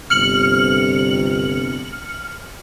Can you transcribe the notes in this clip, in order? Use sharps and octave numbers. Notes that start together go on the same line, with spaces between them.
G1 C3 F6 C#7 F#7